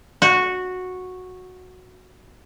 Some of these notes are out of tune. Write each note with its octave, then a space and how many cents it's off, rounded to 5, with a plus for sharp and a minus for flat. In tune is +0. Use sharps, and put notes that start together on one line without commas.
F#4 -10